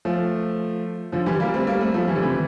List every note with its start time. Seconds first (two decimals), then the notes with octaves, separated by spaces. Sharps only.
0.05 F3 A3
1.12 D3 F3
1.26 E3 G3
1.40 G3 A#3
1.54 A3 C4
1.67 G3 A#3
1.80 A3 C4
1.94 F3 A3
2.08 E3 G3
2.16 D3
2.21 C3 E3